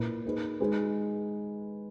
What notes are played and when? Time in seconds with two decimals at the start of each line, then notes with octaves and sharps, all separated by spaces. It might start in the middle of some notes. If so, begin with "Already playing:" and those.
Already playing: A#2 A#3 E4 B4
0.25 A#3 D#4 G#4 B4
0.60 G#3 D#4 G#4 B4